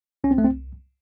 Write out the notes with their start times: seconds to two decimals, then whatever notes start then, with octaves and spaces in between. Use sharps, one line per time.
0.24 C2 C#4
0.31 C4
0.38 A3
0.42 C2 C4